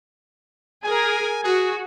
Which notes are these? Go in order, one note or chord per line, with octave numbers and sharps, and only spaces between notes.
G#4 A#4 G#5
F#4 G#4